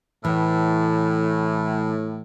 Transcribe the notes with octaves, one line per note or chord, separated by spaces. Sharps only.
A2 E3